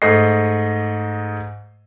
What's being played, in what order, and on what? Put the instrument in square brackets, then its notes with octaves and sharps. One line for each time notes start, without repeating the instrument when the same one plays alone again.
[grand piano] G#2 A3 D#5 C7